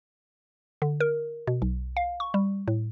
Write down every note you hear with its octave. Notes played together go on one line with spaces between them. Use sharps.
D3
A#4
B2
B1
F5
C#6
G3
A2